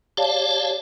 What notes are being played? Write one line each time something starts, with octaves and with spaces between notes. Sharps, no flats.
G4 C#5 D5 F5 A5